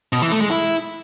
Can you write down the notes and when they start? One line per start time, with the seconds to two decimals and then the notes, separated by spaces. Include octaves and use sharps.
0.13 B2
0.22 E3
0.32 A3
0.41 G#3
0.51 E4